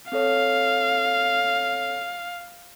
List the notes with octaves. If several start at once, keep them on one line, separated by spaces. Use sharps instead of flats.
C4 A4 C#5 F5